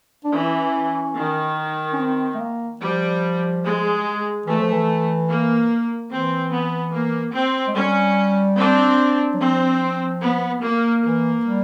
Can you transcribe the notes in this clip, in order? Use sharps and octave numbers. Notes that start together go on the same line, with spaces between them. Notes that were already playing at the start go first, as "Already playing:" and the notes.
D4
E3 C#4
D#3
C#4
C4
A3
A#3
F3 G3
G#3
E3 A3
F3
E3
A#3
E3 C4
B3
A#3
C4
G#3
G3 C#4
C4 D4
F#3
F3 C4
B3
A#3
E3 A#3
G3